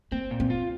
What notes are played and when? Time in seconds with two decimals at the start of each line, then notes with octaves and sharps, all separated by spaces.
0.12 A#3 C4
0.31 A#2
0.40 C4
0.50 F4